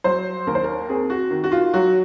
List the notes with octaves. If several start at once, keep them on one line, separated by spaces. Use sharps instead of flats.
F#3 C5
D#2 A#4
C5
A#4
C4 G#4
F#4
D#3
F#4
F4
F#3 F#4